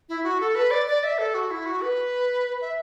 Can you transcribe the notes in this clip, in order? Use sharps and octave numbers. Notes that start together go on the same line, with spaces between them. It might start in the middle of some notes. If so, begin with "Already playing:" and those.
E4
F#4
A4
B4
D5
D5
E5
A4
F#4
E4
F#4
B4
E5